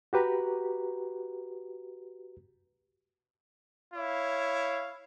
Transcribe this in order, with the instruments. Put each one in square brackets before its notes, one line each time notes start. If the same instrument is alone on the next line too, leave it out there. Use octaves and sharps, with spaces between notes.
[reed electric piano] F#4 G4 B4 A#5
[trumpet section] E4 C#5 F5